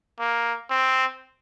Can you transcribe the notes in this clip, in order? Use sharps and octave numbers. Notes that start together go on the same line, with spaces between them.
A#3
C4